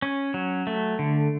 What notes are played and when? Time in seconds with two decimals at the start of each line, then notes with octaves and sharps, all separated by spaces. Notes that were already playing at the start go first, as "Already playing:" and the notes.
0.02 C#4
0.34 F#3
0.67 A3
0.99 D3